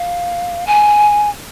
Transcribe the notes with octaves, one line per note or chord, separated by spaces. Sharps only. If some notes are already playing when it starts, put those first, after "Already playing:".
Already playing: F5
G#5